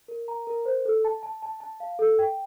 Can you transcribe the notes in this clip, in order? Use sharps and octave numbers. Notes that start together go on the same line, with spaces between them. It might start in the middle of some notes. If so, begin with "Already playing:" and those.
A#4
A#5
A#4
C5
A4
A5
A5
A5
A5
F5
A4
G5